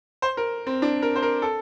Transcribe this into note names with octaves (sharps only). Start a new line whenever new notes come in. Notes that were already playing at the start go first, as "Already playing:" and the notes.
C5
A#4
C4
D4
A#4
C5
A#4
A4